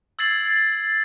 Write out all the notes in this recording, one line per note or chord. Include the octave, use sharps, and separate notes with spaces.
E6 G#6 A6 C7 F#7